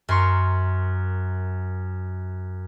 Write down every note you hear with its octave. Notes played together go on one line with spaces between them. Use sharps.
F#2 A#4 C6 C#6